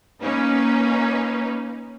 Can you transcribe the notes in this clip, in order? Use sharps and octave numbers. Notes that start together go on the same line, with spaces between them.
A#3 C#4 D#4 B4